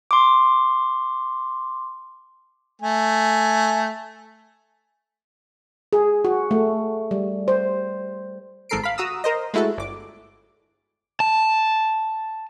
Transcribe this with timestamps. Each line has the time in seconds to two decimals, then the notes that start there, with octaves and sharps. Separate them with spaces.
0.11 C6 D6
2.82 A3 G#5
5.93 G#4
6.25 F#4
6.51 A3
7.11 G3
7.48 C5
8.69 G#1 G#2 A4 A#4 C7 D7
8.83 F5 B5
8.98 F#4 A#5 D#6 E6
9.24 A#4 C5 D#5
9.54 G#3 A3 E4 F#4 A4
9.78 G1 D6
11.20 A5